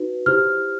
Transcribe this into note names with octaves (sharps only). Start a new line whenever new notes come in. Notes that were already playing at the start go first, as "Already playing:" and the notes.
Already playing: D#4 F#4 B4
E4 G4 C5 F6